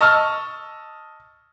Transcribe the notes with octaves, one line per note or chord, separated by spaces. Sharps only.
D#5 A5 C#6 E6 F6